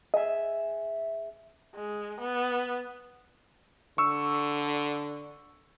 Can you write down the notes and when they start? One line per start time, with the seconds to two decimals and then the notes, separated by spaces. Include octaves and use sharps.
0.14 G#4 D#5 E5
1.75 G#3
2.20 B3
3.98 D3 C#6 E6